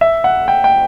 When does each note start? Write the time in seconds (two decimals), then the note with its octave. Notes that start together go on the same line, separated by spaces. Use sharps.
0.01 E5
0.24 F#5
0.48 G5
0.64 G5